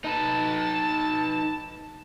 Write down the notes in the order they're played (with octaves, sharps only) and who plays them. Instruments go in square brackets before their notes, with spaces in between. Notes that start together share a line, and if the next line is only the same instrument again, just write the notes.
[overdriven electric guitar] D#4 B4 [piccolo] A5